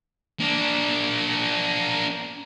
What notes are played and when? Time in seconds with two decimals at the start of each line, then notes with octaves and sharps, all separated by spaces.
0.40 A#3 D4